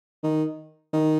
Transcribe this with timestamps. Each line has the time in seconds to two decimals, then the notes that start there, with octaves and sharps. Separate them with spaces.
0.23 D#3
0.93 D#3